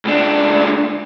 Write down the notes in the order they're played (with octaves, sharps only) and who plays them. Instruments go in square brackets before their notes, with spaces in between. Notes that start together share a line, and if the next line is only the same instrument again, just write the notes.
[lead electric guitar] C#2 D4